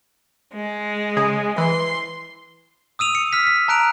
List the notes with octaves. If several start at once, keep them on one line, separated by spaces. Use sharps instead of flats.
G#3
C#3 G#4
E3 C6
D#6 E6 D#7 F7
C#7
E6 F6 B6 C#7
B6
A5 A#5 F#6 D7 F7